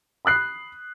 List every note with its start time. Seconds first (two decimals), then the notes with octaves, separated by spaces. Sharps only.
0.25 B5 D#6 F#6 C7